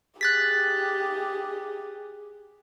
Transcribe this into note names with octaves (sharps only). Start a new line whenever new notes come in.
G4 G#4 F#6 A6 B6